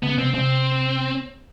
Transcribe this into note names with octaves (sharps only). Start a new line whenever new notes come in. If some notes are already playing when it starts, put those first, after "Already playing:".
C#3 B3
C3 C4
C3 C4